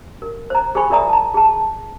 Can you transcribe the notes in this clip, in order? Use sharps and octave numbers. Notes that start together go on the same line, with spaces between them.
A#4
C5 A#5
G#4 A4 C5 G#5 B5 C#6
F4 A#4 D5 E5 A#5 D#6
A5 A#5
G#4 A5